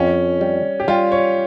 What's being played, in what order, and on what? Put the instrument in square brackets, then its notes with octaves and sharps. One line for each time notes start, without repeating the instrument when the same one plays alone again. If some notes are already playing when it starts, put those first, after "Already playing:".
Already playing: [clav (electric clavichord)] F2 [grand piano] C#4
[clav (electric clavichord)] G3
[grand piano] G4
[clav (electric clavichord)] G3 [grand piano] F4
[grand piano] C#5